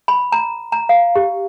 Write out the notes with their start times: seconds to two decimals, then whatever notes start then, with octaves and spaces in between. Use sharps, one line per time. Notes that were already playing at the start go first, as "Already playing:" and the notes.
0.08 B5
0.32 A#5
0.72 A#5
0.89 F5
1.16 G4